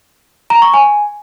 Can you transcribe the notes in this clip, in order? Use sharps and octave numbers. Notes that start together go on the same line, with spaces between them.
A#5
C#6
G#5